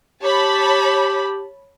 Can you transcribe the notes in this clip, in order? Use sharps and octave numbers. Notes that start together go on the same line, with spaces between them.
G4 C#5 A5 B5